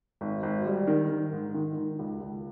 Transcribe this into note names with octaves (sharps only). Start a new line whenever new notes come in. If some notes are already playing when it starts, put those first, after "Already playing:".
G#1
G#1
G3
D#3
D#3
G#2
D#3
D#3
C#2
C#2